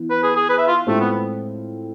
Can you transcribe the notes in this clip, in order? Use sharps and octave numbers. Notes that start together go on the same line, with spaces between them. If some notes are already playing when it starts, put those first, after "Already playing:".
Already playing: E3 B3 E4
B4
G#4
G#4
B4
E5
F4
A2 G#3 A3 C4 F4 A4
B3